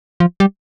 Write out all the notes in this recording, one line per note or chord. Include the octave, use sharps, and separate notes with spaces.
F3
G3